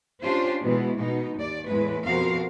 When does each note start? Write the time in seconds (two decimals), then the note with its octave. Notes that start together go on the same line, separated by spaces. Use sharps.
0.22 C#4 D4 F4 G4 C5
0.61 B2 E3 G#3 B3
0.98 B2 D#4
1.37 D#2 D5
1.68 E2 A2 G#3 B4
2.04 F2 B2 F3 F#4 A#4 F5